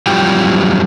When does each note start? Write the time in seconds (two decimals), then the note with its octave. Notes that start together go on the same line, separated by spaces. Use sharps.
0.07 F2 F#3 G3 F4 G4 G5